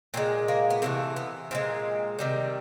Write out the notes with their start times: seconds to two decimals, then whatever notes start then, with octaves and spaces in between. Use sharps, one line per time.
0.14 A#2 F3 G#3 C4
0.48 A#3
0.70 B3
0.82 C3 E3 A3 A#3
1.16 B3
1.51 A#2 F3 G#3 C4
2.19 C3 D#3 G3